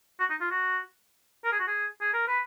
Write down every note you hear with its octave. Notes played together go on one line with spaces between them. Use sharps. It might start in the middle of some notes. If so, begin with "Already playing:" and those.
F#4
D#4
F4
F#4
A#4
G#4
F#4
G#4
G#4
A#4
B4